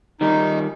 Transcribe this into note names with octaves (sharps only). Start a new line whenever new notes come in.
D#3 G3 D#4